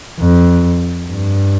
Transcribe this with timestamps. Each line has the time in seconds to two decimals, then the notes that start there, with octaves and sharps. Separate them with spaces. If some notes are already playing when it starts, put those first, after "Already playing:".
0.20 F2
1.08 G2